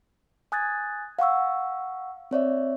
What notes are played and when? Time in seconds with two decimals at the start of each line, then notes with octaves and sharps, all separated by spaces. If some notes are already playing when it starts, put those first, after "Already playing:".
0.52 G#5 D#6 F#6 G#6 A6
1.19 F5 F#5 C#6 E6
2.31 C4 C#5 D5 E5